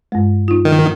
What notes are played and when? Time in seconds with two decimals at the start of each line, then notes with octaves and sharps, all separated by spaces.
0.12 G2 G#3
0.48 D#4 F4
0.65 D#3